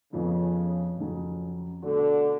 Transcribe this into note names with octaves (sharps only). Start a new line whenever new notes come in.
F2 C#3 F3 B3
F2 C#3 F#3
B2 D3 A3 D4 F#4